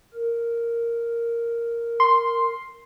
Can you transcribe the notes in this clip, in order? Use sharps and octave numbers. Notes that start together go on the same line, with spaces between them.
A#4
C6